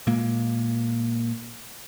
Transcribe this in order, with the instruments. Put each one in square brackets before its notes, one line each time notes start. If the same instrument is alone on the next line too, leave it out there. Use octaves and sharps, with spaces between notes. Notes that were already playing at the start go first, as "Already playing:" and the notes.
[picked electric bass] A#2 G#3 A#3